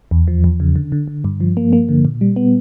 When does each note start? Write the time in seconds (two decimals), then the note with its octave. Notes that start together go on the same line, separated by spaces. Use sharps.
0.11 E2
0.28 F3
0.44 E2
0.60 C#3
0.76 D3
0.92 D3
1.08 D3
1.24 G2
1.40 F3
1.57 A#3
1.73 A#3
1.89 D3
2.05 A#2
2.21 G3
2.36 B3